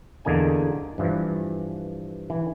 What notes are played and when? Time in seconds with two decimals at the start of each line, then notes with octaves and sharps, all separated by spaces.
0.25 E2 D3 A#3 D#4 G#5
0.98 G2 E3 F3
2.30 E3